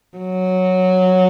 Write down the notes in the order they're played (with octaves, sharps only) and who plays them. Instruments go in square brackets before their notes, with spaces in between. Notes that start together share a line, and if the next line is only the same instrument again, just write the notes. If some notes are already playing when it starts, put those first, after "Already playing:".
[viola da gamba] F#3